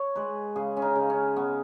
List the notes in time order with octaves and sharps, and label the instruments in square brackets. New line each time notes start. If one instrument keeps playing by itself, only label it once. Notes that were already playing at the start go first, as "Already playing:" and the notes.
Already playing: [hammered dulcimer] C#5
G#3 B4
C#3 G#4
C#4
D#4
C#3
C#4
B3 C#4